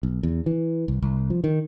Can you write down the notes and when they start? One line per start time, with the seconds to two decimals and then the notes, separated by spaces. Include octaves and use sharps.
0.03 B1
0.23 E2
0.46 E3
0.88 C2
1.02 C2
1.30 F3
1.44 D#3